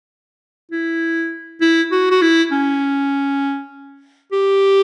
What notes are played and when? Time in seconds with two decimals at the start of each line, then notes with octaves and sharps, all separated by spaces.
0.71 E4
1.61 E4
1.91 F#4
2.11 F#4
2.22 E4
2.52 C#4
4.32 G4